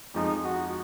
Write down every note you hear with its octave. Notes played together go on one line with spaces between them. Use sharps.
F2 F3 G#3 D#4
F#4